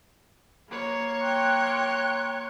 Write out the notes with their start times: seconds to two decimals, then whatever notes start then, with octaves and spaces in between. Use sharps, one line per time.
0.69 A#3 C#5
1.20 G5 C6 F#6